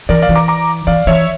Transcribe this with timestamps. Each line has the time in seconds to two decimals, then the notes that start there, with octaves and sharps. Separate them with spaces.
0.09 E3 A#4 D5
0.22 D5 F5
0.29 E3
0.35 A#5 D6
0.48 A#5 D6
0.87 E3 D5 F5
1.07 E3 C#5 E5